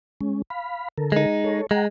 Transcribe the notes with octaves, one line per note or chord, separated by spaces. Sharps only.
G#3 C#4
F5 B5
D3 A4 A#4
G#3 D#4
A4 C#5
G#3 F#5 G5 A#5